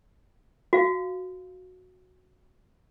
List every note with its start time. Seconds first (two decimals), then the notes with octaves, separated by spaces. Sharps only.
0.73 F#4 F5